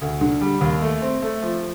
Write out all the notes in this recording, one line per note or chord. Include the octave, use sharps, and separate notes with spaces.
D2
D3
G3
D#2
A3
C4
A3
F3